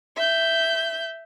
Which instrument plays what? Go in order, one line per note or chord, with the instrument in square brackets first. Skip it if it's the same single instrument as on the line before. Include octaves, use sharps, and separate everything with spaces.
[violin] E5 G6